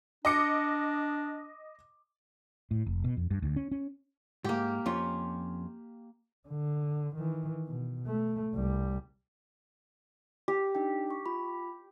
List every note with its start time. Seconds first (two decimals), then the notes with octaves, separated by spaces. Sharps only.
0.25 D4 D#5 D6 C#7
2.71 A2
2.86 F1
3.04 B2
3.17 F2
3.31 G2
3.42 D2
3.56 C#4
3.71 C#4
4.44 G#2 A#3 G4
4.86 F2 C#4 F4
6.48 D3
7.16 D#3 E3
7.67 B2
8.06 A3
8.54 C2 G3
10.48 G4
10.75 D4 D#4 G5
11.11 C#6
11.26 F4 B5